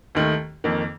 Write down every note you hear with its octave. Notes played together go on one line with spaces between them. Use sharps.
D#2 D#3 A3
F2 D#3 A#3